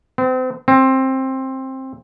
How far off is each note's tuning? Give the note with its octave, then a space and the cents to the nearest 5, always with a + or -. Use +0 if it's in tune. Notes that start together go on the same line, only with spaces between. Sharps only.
C4 -35
C4 +15